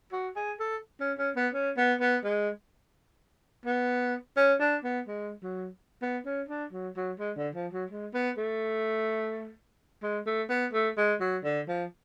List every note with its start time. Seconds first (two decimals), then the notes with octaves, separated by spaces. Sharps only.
0.12 F#4
0.36 G#4
0.60 A4
1.01 C#4
1.18 C#4
1.36 B3
1.54 C#4
1.77 B3
2.01 B3
2.24 G#3
3.66 B3
4.37 C#4
4.60 D4
4.84 B3
5.08 G#3
5.43 F#3
6.02 B3
6.26 C#4
6.49 D4
6.72 F#3
6.96 F#3
7.19 G#3
7.37 D3
7.55 F3
7.73 F#3
7.90 G#3
8.14 B3
8.37 A3
10.03 G#3
10.26 A3
10.50 B3
10.73 A3
10.97 G#3
11.21 F#3
11.44 D3
11.68 F3